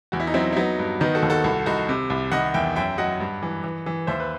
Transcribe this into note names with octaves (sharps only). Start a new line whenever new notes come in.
E2 F#4
E4
D#4
F#3 C4 E4
E4
F#3 B3 D#4
G2
D#3 B3 D#4
F#4 A4
D#2
F#4 A4
C2 F#4 A4
C2 D#4 F#4
C3
C2
D#3 D#5 F#5
E2 E5 G5
F#2 E5 G5
F#3 D#5 F#5
G2
E3
E3
E3
D#2 C5 E5
B4